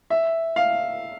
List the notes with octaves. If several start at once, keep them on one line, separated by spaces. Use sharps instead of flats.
E5
F5